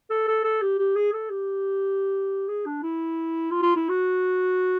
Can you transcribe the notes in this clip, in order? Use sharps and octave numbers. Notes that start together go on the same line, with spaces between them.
A4
A4
A4
G4
G4
G#4
A4
G4
G#4
D4
E4
F4
F4
E4
F#4